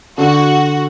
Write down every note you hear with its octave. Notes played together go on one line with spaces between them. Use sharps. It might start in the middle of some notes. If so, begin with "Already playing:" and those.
D3 F#4